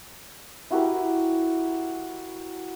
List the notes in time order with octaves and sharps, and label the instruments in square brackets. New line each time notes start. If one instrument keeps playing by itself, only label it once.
[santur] E4 F#4 G4 A#4